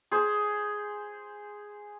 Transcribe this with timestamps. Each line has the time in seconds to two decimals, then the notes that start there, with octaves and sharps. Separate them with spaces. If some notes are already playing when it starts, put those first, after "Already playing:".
0.11 G#4 C5